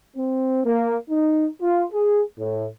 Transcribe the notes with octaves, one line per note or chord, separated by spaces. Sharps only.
C4
A#3
D#4
F4
G#4
A2